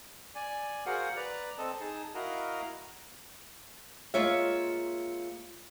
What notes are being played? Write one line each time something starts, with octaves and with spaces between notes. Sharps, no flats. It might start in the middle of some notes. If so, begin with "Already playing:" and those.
D5 G#5
F#4 G#4 A#4 C5 F5 F#5
B4 D5 A#5
C4 A4 D#5 A5
D#4 G#4 A5
E4 F#4 A#4 D#5 F5 A#5
G#3 A#3 F4 C#5 E5